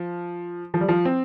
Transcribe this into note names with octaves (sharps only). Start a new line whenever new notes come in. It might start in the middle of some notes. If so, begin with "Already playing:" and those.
Already playing: F3
F3
G3
F3
C4